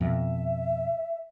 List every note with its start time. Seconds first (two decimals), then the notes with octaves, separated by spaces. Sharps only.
0.01 F2 B2 E5